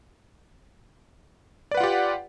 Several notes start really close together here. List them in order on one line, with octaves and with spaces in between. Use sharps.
D5 B4 F#5 F4 G4